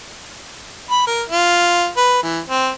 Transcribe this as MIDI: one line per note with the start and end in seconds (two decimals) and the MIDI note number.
0.91 1.05 83
1.07 1.22 70
1.30 1.89 65
1.97 2.22 71
2.23 2.39 52
2.48 2.70 60